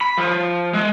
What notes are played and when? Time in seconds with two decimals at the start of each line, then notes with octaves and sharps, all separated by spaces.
0.01 B5
0.18 F3
0.74 G#3